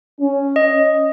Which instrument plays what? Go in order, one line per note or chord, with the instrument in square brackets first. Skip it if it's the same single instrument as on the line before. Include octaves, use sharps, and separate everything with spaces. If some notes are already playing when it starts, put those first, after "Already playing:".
[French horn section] C#4
[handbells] D#5